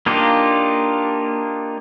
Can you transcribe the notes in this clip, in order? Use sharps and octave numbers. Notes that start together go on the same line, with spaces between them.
A#3 D4 D#4 F4 G4